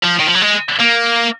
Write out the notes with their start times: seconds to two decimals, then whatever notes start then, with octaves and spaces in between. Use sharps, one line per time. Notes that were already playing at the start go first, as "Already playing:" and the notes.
0.03 F3
0.19 D#3
0.26 F3
0.35 F#3
0.42 G#3
0.80 A#3